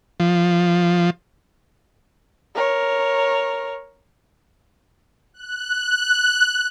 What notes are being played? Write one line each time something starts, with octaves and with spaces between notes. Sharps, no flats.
F3
A#4 C#5
F#6